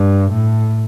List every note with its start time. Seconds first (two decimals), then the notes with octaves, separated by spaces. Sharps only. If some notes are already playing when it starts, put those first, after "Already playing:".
Already playing: G2
0.31 A2